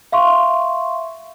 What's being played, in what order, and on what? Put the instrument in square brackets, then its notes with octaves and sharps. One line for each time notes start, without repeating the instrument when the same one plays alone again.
[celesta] E5 F5 C6 C#6